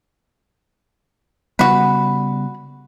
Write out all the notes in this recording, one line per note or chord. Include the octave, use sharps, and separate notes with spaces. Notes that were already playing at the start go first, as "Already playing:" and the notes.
C#3 G3 B3 F#4 B4